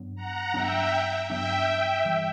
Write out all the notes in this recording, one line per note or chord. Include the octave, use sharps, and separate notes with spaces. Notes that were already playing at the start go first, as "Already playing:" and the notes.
Already playing: G2 F#3 B3 D4
F#5 A#5
G2 F#3 B3 D4 E5 G5
G2 F#3 B3 D4 E5 G5
E5 G5
G2 E3 G3